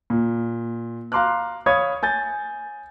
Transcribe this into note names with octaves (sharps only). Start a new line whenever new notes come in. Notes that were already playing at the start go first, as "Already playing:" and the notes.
A#2
F5 A#5 C6 D6 F6 F#6
C#5 F5 B5 D#6 G#6
G#5 G6 A6